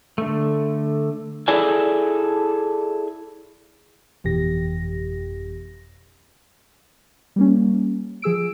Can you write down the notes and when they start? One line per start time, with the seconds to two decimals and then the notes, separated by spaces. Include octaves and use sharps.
0.18 D3 A3
1.48 E4 G#4 A4 D5 G#5
4.24 G1 F2 B2 E3 G4 A#6
7.36 G3 A#3 C#4
8.22 F3 G#4 E6 D7